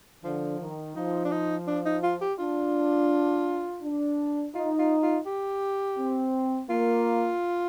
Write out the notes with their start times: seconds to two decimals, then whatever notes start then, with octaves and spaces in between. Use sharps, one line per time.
0.24 D3 F3
0.59 D#3
0.96 F3 D#4
1.25 D4
1.31 D#4
1.67 D4
1.85 D#4
2.03 F4
2.21 G4
2.39 D4 F4
3.82 D4
4.55 D#4 F4
4.79 F4
5.02 F4
5.26 G4
5.98 C4
6.70 A#3 F4